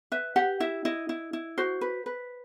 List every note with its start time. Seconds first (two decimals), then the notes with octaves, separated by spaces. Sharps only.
0.12 B4 E5
0.36 G4 F#5
0.60 E4 E5
0.85 E4 D#5
1.09 E4
1.33 E4
1.58 F#4 C5
1.81 B4
2.06 B4